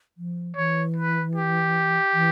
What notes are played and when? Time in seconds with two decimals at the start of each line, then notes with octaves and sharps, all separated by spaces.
0.17 F3
0.56 E3 C#5
0.96 B4
1.36 G4
2.13 E3